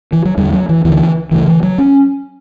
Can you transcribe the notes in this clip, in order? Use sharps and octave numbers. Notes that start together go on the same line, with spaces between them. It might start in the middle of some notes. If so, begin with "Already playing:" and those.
E3
F#3
E2 D3 G3
F#3
E3
D2 D3 E3
D2 C#3 E3
E3
F#3
C#4